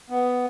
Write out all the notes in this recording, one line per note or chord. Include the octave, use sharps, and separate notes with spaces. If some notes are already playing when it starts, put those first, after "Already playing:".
B3